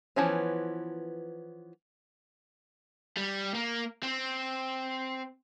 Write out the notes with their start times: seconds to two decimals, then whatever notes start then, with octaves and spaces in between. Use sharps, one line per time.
0.16 E3 F3 B3 C#4
3.17 G3
3.54 A#3
4.03 C4